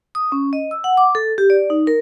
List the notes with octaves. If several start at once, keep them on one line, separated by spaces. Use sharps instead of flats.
D#6
C#4
D#5
E6
F#5
D6
A4
G4
D5
D#4
A#4